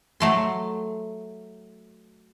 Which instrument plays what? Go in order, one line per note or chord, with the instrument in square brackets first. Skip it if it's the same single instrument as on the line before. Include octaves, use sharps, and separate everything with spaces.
[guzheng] F#3 A3 C6